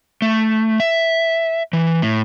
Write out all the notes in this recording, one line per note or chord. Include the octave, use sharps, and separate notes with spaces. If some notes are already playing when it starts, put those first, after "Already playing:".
A3
E5
E3
A2